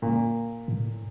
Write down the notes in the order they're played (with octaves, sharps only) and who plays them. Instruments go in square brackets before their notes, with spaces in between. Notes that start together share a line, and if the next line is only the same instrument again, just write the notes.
[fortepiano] A#2
[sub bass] A2